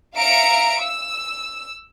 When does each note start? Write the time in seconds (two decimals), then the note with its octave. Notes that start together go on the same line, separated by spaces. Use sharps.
0.16 E5 F5 A#5 C#7 D7
0.82 E6